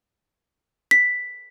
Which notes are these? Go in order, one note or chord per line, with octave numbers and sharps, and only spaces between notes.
B6